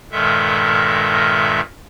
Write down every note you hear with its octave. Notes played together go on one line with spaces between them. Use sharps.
G2 A#2 D#3 G#3 A4 E5